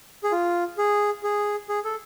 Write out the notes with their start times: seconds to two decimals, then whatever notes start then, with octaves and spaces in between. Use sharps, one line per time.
0.24 G#4
0.32 F4
0.78 G#4
1.24 G#4
1.69 G#4
1.85 A4